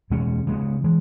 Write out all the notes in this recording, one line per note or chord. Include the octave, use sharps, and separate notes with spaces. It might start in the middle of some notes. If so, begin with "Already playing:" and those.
E2 B2 G#3 C#4
C#3 G#3 B3
E3 G#3